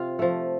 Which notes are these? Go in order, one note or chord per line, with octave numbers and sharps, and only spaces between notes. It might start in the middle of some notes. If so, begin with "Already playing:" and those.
Already playing: C3 F4 F5
F3 A3